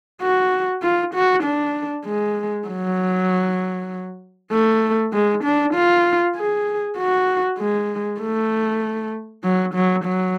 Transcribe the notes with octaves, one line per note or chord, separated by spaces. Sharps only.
F#4
F4
F#4
D4
G#3
F#3
A3
G#3
D4
F4
G#4
F#4
G#3
A3
F#3
F#3
F#3